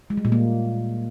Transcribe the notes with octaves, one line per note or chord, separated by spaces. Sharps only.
G#3
G3
A#2
A#3